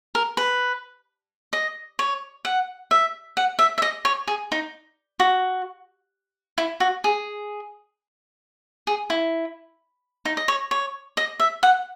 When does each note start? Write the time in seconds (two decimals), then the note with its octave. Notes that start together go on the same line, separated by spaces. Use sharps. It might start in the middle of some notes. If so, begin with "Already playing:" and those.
0.15 A#4
0.37 B4
1.53 D#5
1.99 C#5
2.45 F#5
2.91 E5
3.37 F#5
3.59 E5
3.78 E5
3.82 D#5
4.05 C#5
4.28 G#4
4.52 D#4
5.20 F#4
6.58 E4
6.80 F#4
7.04 G#4
8.87 G#4
9.10 E4
10.25 D#4
10.37 D#5
10.48 C#5
10.71 C#5
11.17 D#5
11.40 E5
11.63 F#5